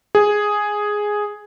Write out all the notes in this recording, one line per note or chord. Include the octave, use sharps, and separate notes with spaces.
G#4